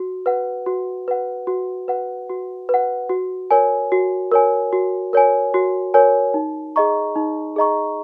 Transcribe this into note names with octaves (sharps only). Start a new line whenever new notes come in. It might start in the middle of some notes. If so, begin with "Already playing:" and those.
Already playing: F#4
B4 F#5
F#4
B4 F#5
F#4
B4 F#5
F#4
B4
F#5
F#4
A#4 C#5 G#5
F#4
A#4 C#5 G#5
F#4
A#4 C#5 G#5
F#4
A#4 C#5 G#5
D#4
G#4 D#5 A#5 C#6
D#4
G#4 D#5 A#5 C#6